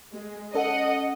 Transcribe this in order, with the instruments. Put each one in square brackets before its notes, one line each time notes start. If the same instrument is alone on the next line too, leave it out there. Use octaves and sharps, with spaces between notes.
[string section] G#3
[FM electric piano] C#4 A4 [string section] D#5 F#5